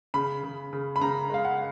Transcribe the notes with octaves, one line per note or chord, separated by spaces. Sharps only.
C#3 B5
C#3
C#3
B5
C#3 A#5
G#3 F5
F#5